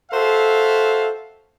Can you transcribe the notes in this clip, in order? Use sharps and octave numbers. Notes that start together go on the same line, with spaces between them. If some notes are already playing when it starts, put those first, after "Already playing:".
F#4 A4 C5 E5 F5